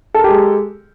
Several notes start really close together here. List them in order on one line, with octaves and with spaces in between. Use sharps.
A4 A#4 G4 G#3